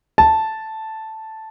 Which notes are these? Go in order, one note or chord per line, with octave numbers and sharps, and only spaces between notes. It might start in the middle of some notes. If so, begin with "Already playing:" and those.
A5